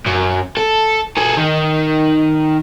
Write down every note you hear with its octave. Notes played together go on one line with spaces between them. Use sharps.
F#2
A4
G#4 A4
D#3